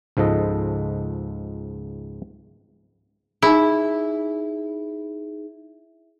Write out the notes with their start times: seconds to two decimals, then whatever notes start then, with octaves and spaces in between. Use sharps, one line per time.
0.17 C#2 G#2 F3 A4 D#5
3.42 D#4 E4 G#4